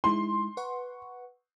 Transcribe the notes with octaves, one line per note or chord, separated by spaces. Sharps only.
G#3 D#4 E4 C6
B4 F#5 C#6